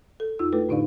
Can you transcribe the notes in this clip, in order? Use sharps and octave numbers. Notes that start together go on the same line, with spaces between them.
A4
F2 D#4 F4 E6
A3 E4 A4 B4
A2 D3 D4 D#4 D5 F5